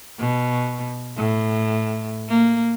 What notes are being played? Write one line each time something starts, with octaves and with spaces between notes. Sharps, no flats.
B2
A2
A#3